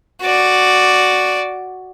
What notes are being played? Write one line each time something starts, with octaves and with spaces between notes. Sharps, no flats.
F#4 D5